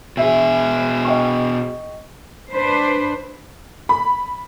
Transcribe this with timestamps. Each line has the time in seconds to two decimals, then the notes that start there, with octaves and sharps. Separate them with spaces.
0.17 B2 G#4 E5
1.05 D#5 G5 C#6
2.50 D4 B4 C5
3.89 B5